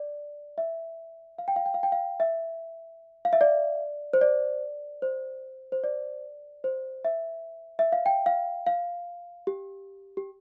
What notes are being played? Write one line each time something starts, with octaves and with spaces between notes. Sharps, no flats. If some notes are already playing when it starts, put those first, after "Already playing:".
Already playing: D5
E5
F5
G5
F5
G5
F5
G5
F5
E5
F5
E5
D5
C5
D5
C5
C5
D5
C5
E5
E5
F5
G5
F5
F5
G4
G4